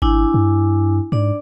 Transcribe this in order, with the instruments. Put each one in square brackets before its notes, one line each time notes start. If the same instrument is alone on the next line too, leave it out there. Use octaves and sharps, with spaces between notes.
[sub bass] G#1 [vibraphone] D4 E4 G#5
[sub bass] G2
[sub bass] G#2 [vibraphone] D4 D5